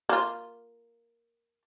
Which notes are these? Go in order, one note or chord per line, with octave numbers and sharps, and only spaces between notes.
A#3 F4